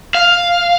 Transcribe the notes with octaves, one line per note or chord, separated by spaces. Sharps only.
F5